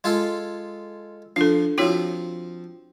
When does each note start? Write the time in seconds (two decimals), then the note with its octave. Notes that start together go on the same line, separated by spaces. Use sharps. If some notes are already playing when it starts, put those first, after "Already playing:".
0.04 G#3 F4 A4
1.36 F3 D4 A4
1.78 F3 C4 E4 F#4 C#5